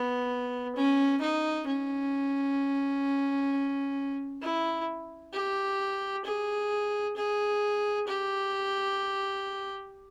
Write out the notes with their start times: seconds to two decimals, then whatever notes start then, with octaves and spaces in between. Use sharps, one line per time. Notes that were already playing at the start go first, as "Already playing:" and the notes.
Already playing: B3
0.75 C#4
1.21 D#4
1.67 C#4
4.41 E4
5.33 G4
6.25 G#4
7.16 G#4
8.07 G4